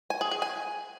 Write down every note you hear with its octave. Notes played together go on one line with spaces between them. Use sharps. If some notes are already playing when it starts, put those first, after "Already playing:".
G#5
G#4
G#4
G#5